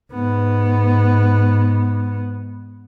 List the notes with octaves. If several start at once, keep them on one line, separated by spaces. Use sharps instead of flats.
G#2 B3